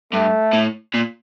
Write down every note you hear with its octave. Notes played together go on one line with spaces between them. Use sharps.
G2 A3
A2
A#2